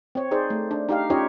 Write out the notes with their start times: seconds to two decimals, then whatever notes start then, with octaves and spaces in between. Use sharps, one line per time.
0.15 C4 C#5
0.31 D#4 G#4 C5 D5
0.50 A3
0.71 D4
0.89 D#4 G4 F5
1.10 C#4 D#4 F4 G4 C#5 D#5